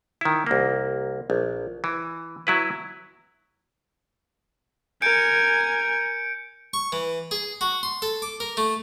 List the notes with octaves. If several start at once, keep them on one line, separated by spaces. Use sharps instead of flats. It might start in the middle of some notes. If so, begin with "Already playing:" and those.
D#3 E4
C2 A#3
A#1
E3
F#3 E4 B4
A#4 G#5 G6 C#7 D7
C#6
E3
G#4
F#4
C6
A4
D6
A#4
A3